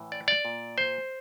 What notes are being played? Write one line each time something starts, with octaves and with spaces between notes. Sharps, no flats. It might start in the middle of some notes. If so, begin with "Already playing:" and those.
Already playing: A2 E3
D5
D5
A#2
C5